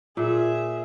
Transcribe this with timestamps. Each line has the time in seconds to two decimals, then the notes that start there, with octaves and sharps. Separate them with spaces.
0.17 A#2 G#4 E5